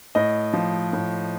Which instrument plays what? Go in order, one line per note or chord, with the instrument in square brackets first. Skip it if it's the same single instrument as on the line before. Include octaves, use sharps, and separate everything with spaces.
[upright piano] A2 D#5
F3
A2